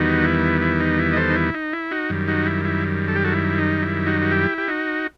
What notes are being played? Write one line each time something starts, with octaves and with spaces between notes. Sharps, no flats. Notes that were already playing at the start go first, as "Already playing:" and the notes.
Already playing: E2 D#3 G3 B3 D#4 F#4
E4
E4
D#4
E4
D#5
A4 C5
D#4
E4
D#4
E4
D#4 F#4
F#2 D#3 G3
D#4 F#4
E4
E4
A4
G4
F#4 A4
E4
D#4
E4
D#4 F#4
F#4
E4 G4
G4
D#4 F#4